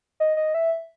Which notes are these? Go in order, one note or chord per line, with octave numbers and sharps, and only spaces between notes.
D#5
D#5
E5